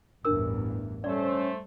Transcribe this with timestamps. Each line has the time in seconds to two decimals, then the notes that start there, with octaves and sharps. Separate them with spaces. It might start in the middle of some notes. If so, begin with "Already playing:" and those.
0.25 A1 E2 G2 D4 A#4 E6
1.04 G3 A3 C#4 C5 D5